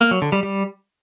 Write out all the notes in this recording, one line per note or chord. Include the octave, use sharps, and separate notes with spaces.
A#3
F#3
D3
G3
G3